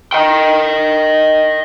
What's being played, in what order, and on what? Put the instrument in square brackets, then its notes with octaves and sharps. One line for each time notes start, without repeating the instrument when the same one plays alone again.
[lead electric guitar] D#5 G5